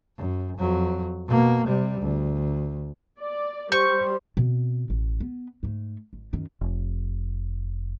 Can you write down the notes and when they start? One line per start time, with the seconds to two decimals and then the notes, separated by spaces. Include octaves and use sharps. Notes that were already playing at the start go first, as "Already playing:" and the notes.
0.17 F#2
0.58 F2 F#3
1.27 B2 A#3
1.66 C3 G3
2.01 D2
3.19 D5
3.72 G3 C5 C#6 G6
4.37 B2 C4
4.90 A1
5.20 B3
5.63 G#2 A3
6.13 G#1
6.33 F#2 D#3
6.61 F1